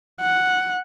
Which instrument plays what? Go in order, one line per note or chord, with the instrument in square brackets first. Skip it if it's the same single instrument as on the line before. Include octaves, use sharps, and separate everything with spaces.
[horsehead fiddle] F#5